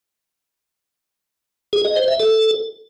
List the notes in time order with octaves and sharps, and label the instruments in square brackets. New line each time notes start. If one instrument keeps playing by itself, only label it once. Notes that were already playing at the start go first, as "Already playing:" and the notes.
[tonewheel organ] G#4
D#5
C5
E5
A4